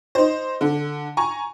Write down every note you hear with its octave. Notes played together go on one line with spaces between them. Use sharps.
D#4 C5
D3
G#5 A#5 C#6